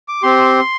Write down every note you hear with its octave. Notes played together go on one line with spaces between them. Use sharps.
D6
C4 G4 C6